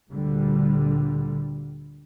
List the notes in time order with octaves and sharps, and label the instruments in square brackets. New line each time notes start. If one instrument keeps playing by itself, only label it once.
[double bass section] D2 A#2 D3 G3